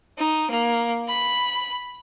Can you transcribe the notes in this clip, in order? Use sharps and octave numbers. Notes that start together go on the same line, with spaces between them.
D#4
A#3
B5